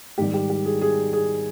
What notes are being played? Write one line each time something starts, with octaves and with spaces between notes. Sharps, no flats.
G#2 D#3 G3 G4
G4
G4
G#4
G#4
G#4